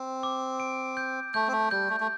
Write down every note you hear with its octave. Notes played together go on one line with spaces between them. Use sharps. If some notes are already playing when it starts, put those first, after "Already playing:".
Already playing: C4
D6
D7
G6
A3 G6
C4
A3
G3 G6
A3
A3